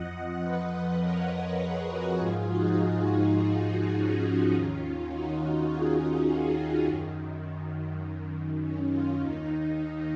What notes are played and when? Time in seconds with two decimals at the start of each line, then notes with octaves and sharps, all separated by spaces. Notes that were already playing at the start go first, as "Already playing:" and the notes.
Already playing: F2 F3 D#5 F#5
0.43 B4 D#5
1.01 A#4 C#5
1.60 G#4 B4
1.89 F#4 A#4
2.18 G#2 F3 F4 G#4
2.47 D#4 F#4
2.76 D#4 F#4
3.93 C#4 F4
4.22 C#4 F4
4.52 D#2 D#3 C#4 F4
5.10 D#4 F#4
5.69 F4 G#4
6.86 F#2 D#3
8.61 C#4
8.90 C#4 F4
9.20 D#2 D#3 D#4